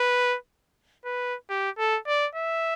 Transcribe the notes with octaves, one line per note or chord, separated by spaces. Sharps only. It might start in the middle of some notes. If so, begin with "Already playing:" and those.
Already playing: B4
B4
G4
A4
D5
E5